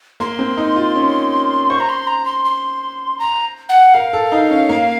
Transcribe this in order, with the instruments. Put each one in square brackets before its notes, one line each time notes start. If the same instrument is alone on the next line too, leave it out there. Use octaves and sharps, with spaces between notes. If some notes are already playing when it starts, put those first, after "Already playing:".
[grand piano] A#3 [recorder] C6
[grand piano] C4
D#4
F4
C#4
[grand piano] C5 [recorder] C#6
[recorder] A#5
C6
A#5
C6
C6
A#5
F#5
[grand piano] A#4 [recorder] F5
[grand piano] A4
D#4
C#4
A#3